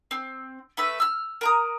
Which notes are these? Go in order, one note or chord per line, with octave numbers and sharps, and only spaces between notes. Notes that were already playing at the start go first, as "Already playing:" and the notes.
C4
A3 B4 E5
E6 F6
A#4 A#5 D#6